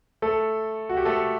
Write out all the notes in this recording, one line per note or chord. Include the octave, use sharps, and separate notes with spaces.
A3 A4
F#4
G4
A3 A4